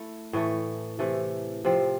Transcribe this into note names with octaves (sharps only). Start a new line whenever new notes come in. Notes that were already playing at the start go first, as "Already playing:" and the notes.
Already playing: A3 E4
A2 E3 A3
C3 E3 A3
C3 F3 C4